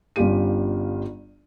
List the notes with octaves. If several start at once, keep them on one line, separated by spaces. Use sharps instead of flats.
G1 G2 C#4 F4 G4 D#7